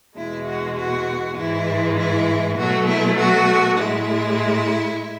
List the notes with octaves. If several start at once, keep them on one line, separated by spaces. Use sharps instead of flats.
E2 B2 G#3 E4
F#4
F#4
G#2 E3 G#3 E4
E4
B2 F#3 A3 F#4
E4
F#4
A2 G#3 E4